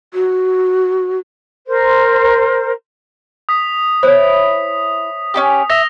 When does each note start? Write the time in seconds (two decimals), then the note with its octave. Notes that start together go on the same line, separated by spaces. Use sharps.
0.14 F#4
1.67 A#4 C5
3.49 D#6 B6
4.03 E4 C5 C#5
5.34 C#4 F4 G4 D#6
5.70 E5 A#6 F7 G7